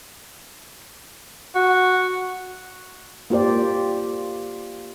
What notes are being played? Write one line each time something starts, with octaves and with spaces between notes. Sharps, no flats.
F#4
A#3 F4 G4 C5 D5